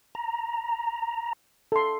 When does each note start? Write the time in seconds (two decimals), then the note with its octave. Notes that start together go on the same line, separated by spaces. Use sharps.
0.15 A#5
1.72 A4 C6